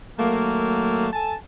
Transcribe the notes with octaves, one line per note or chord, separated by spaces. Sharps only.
D#3 F#3 A3 A#3
A4 G#5 A5